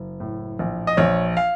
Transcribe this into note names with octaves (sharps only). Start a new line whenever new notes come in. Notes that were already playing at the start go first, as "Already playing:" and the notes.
Already playing: F#1
A2
A#1
D#5
A#1 C#5
F5